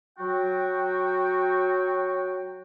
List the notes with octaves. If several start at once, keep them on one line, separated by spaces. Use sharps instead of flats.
F#3 F#4 G5